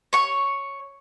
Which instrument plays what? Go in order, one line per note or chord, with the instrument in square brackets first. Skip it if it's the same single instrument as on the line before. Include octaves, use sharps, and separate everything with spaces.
[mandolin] C#5 C#6